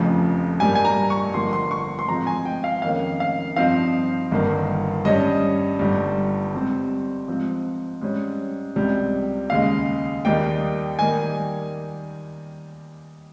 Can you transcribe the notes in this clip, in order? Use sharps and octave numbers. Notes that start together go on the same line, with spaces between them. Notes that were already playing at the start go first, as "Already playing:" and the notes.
Already playing: F1 F2 C#3 F3
G2 G3 A#3 G#5
G#5
A#5
C#6
G1 G2 F3 A#3 C6
C6
C#6
C6
G#2 F3 G#3 C4 A#5
G#5
G5
F5
F2 D#3 A#3 C#4 F5
F5
G2 F3 C4 D#4 F5
G1 G2 D#3 A#3
G2 G3 C#4 D#5
G1 G2 G3
G#2 G3 C4
G#2 F3 C4
G#2 G3 C#4
C#2 C3 G3
D#2 C#3 G#3 F5
D#2 D#3 G3 A#3 D#4 G5
D#3 G3 A#3 G#5